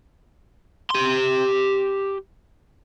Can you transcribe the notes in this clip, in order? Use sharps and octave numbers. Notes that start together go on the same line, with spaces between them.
G4 C6